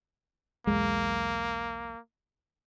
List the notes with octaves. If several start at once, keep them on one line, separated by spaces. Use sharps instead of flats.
B1 E2 G#3 A#3